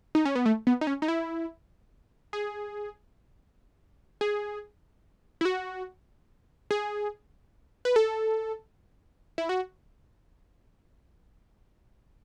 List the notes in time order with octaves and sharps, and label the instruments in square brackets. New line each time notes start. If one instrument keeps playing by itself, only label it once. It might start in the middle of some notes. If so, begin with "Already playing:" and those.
[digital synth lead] D#4
C#4
B3
A3
B3
D#4
C#4
D#4
E4
G#4
G#4
E4
F#4
G#4
B4
A4
E4
F#4